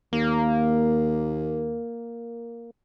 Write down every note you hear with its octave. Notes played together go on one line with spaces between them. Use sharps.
D#2 A#3